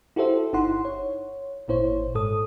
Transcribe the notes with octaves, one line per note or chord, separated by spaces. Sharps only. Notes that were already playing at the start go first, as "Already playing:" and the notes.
E4 F#4 G4 A4 C5 E5
G1 D#4 E4 F#5 C6
C#5
G#1 A#2 E4 C5 C#5
G#2 A4 D#6